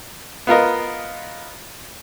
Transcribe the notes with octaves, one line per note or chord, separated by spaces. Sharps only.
B3 F4 A#4 D#5